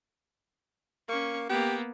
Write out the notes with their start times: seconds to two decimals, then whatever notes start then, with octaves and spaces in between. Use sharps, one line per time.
1.09 A#3 C#4 C#6
1.50 A#3 B3 G4